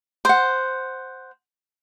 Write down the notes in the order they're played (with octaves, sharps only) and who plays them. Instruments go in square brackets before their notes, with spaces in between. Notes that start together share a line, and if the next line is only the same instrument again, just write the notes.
[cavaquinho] C5 F#5